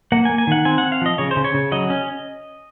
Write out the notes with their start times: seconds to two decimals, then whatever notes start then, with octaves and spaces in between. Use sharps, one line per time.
0.12 A#3 F#5
0.25 G#5
0.30 A#3
0.38 G#5
0.47 D#3 F#5
0.65 C4 G#5
0.78 C4 F#5
0.92 F5
1.01 F3 D#5
1.18 C#3 C#5
1.31 C5
1.36 C#3
1.44 C#5
1.54 C#3
1.72 F#3 D#5
1.90 C#4